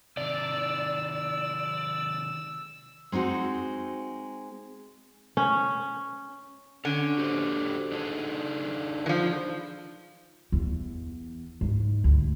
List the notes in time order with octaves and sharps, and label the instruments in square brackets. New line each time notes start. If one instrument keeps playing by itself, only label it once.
[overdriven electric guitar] C3 D#3 [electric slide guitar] D5 [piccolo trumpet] E6
[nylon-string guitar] G#3 C4 D#4 F#4
[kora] C#4
[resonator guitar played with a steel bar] D3 [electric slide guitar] C#4
[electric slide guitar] F#4 G4 C5
D4 D#4 G#4
[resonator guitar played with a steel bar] E3 F3
[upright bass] E2
G#2
D2